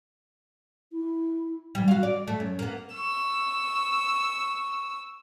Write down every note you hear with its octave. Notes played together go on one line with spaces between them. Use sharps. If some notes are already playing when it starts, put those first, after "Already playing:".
E4
E3 G3
F#4 F5
D5
A3
F#2
A#3 B3
C#6 E6